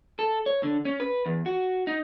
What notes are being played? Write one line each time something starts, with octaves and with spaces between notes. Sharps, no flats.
A4
C#5
D3
C#4
B4
E2
F#4
D#4